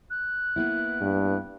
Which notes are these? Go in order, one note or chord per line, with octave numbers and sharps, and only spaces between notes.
F#6
A#3 B3 E4
G2